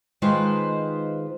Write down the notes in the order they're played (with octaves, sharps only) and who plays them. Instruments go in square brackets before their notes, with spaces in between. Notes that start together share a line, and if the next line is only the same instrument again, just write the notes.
[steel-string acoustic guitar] D#3 G#3 D#4 F4 B4 C5